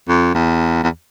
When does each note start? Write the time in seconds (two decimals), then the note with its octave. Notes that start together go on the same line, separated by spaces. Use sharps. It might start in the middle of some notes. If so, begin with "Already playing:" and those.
0.08 F2
0.34 E2
0.83 E2